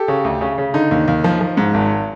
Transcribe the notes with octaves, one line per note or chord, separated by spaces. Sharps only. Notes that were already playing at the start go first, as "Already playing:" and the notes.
Already playing: G4 A4
C#3
D2
C#3
C#3
D3 D#4
D#2
D#2
F3
F3
G#2
G#1